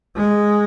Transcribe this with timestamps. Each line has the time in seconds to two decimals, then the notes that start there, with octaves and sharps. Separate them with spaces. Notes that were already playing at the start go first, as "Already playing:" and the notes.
0.16 G#3